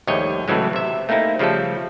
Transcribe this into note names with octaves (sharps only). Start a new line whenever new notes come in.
A#1 D#2 G3 A3 C#5 D#5
A2 C#3 E3 F#3 G#3
C3 E5
A3 A#3 C4 D#4 E4
C#3 F3 G3 A3 A4